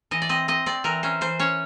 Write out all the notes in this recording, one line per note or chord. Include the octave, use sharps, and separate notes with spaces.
E3 D#5
D5
C4 D#5
C4 D#5
C4 D5
E3 A#4
C#4 C5
E3 C5
C#4 C#5